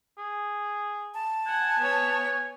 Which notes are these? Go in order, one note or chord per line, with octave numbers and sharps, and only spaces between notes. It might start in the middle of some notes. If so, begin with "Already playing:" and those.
G#4
A5
F#5 G#5
B3 C#5